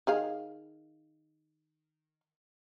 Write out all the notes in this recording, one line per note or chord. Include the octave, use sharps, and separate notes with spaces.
D#3 G#4 F5